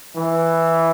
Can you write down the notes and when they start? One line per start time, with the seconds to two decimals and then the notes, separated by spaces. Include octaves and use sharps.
0.16 E3